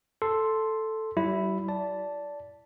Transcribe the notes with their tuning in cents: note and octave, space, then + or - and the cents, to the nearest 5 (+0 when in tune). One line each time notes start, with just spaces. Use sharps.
A4 +0 C6 +0
G3 -45 E4 +0
D5 -20 A5 +0